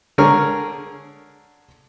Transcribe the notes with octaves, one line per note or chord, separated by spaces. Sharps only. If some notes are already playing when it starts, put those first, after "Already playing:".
D3 G#4 A#4 C#5 F6